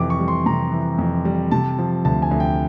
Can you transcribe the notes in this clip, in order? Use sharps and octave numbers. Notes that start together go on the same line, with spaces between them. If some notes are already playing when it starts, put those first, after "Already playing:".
Already playing: F2 C3 E3 D6
C#6
G3
C6
C3 A#5
E3
F2
G3
C3 A5
F3
D2 A5
G#5
D2
G5